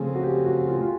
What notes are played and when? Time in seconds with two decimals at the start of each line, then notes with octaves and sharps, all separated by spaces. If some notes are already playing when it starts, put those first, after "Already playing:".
Already playing: C#3 F3 A3 C4 G#4
0.14 F#4
0.23 G4
0.45 F#4
0.67 F4
0.81 F4